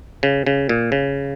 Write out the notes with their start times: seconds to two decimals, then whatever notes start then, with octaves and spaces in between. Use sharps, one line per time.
0.23 C#3
0.47 C#3
0.69 A#2
0.92 C#3